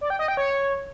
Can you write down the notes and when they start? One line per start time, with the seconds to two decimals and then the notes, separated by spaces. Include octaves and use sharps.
0.01 D5
0.10 G5
0.19 D#5
0.28 G5
0.37 C#5